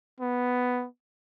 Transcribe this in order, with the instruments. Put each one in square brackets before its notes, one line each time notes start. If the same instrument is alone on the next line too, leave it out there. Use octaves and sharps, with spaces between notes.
[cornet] B3